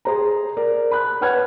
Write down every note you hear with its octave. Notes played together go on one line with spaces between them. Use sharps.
G#4 C5 A#5
A#4 D5
B5 F#6
B4 C#5 F#5 F6 F#6 G#6